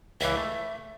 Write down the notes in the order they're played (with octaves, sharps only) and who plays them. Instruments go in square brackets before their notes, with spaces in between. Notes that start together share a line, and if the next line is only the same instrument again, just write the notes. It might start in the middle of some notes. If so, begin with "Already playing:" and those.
[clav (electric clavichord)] C#2 E3 [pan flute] E5
[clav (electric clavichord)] A3